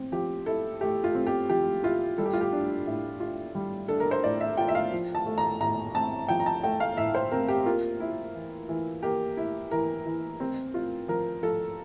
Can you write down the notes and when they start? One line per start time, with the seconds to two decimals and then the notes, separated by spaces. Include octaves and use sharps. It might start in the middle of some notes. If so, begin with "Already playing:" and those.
Already playing: C4
0.12 F3 G4
0.46 E4 A4
0.81 A3 G4
1.04 F4
1.15 C4
1.26 G4
1.49 F3 G4
1.83 E4 F4
2.18 G3 A4
2.26 G4
2.33 F4
2.41 G4
2.53 D4
2.87 A2
3.20 F4
3.55 G3
3.88 D4 A4
4.00 A#4
4.11 C5
4.23 A2 D5
4.40 E5
4.57 F4 G5
4.68 E5
4.75 F5
4.92 F3
5.15 A5
5.26 A3
5.38 A#5
5.61 A2 A#5
5.95 C4 A5
6.28 F3 G5
6.40 A#5
6.46 A5
6.63 A3 G5
6.80 F5
6.97 A2 E5
7.14 C5
7.32 C4 A#4
7.48 G4
7.66 A#3 F4
8.00 E4
8.35 E3
8.69 E3
9.03 A#3 G4
9.37 E4
9.71 E3 A#4
10.06 E3
10.40 C4
10.74 F4
11.08 F3 A#4
11.43 F3 A4